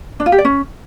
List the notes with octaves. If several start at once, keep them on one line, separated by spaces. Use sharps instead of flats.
D4
F4
G4
D5
C#4